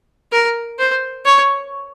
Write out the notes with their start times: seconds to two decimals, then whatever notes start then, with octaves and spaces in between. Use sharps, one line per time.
0.32 A#4
0.79 C5
1.25 C#5